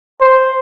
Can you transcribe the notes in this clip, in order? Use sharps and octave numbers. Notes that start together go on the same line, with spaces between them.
C5